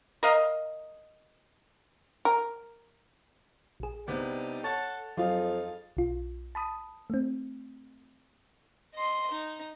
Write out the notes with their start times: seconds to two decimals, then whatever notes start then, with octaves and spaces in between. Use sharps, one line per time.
0.23 A#4 D#5 F5
2.25 A#4
3.80 A#1 G#4
4.08 C3 G3 B3 D4 D#4
4.64 A4 C#5 F#5 A5 A6
5.17 F2 F3 F#3 D#4 F4 G#4 F5
5.97 B1 F4
6.55 A5 B5 D#6
7.10 A3 C4
8.94 D#5 C6
9.31 D#4